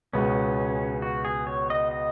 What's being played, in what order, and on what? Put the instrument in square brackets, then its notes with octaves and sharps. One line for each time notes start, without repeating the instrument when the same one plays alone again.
[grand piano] C#2 B2 G#3 B3 [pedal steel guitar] C#4
[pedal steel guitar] F#4
G#4
C#5
D#5
D#5